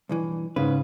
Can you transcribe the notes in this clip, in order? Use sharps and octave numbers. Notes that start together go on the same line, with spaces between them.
B1 G2 E3
G#2 C#3 B4